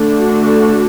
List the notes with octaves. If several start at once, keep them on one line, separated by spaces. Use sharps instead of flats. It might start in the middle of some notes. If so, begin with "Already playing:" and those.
Already playing: D3 A3 D4
F#4